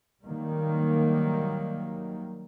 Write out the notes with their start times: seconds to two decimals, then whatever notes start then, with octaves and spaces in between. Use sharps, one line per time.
0.24 D#3 F#3 G3 A#3